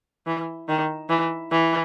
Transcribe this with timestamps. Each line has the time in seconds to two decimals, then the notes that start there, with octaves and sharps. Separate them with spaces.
0.27 E3
0.68 D#3
1.09 E3
1.51 E3